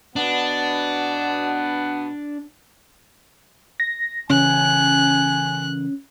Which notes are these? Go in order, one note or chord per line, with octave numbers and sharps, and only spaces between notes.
B2 B3 D4 F#5
A#6
C#3 E3 C#4 G#5 F#6